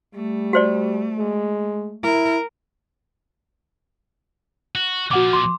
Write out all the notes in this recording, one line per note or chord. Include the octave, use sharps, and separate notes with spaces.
G3 A3
F#4 C5 D5
G#3
E4 A#4
F#4
A#2 F3 F#4 F#5 D6
C6 D6